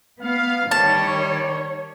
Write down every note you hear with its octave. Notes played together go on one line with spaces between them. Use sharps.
B3 F5
D#3 G3 C#5 A5